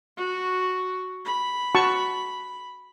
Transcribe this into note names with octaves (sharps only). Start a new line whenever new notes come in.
F#4
B5
F#4 A5 C#6